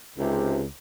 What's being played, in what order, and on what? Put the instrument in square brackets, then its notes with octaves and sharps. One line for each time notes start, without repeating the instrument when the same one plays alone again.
[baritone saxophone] C#2 [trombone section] G#2 C3